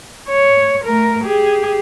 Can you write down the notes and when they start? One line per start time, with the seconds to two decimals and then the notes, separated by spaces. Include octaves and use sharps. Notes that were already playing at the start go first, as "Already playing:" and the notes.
0.28 C#5
0.85 A3 A#4
1.24 G4 G#4